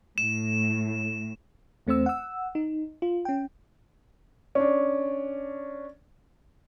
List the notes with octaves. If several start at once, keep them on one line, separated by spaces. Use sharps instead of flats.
A2 E7
E2 A3 C4 C5 E6
F#5 E6
D#4
F4
C#4 G5
C#4 D4